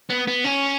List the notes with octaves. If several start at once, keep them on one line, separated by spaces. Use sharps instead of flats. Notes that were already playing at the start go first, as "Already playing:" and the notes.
B3
B3
C#4